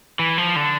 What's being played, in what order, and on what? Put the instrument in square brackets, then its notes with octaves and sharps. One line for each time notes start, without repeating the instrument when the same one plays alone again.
[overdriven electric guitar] E3
F3
D3